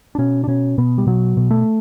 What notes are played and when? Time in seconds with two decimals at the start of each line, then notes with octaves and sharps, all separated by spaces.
0.15 D4
0.18 B2 C#4
0.44 D4
0.47 B2 C#4
0.78 B2 B3
0.98 G3
1.07 B2 F#3
1.37 B2
1.51 A3